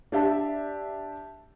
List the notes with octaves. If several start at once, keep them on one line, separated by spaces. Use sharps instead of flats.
D4 G4 E5 A5